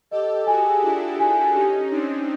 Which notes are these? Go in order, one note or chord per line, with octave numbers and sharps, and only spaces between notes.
G4 A4 D#5
F#4 G#4 G#5
D4 E4 F4
G#5
C#4 D#4 G4
C4 D4 D#4